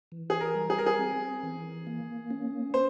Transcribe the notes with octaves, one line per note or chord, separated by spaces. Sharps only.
E3
G#4
A#4
G3
G#4
A#4
G#4
C4
E3
A#3
C#4
C5